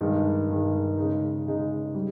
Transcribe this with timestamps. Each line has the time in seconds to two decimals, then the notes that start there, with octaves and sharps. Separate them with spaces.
0.01 G2 D#3 G#3
0.49 G2 D#3 G#3
0.98 C#3 G#3 D#4
1.47 C#3 G#3 D#4
1.95 G3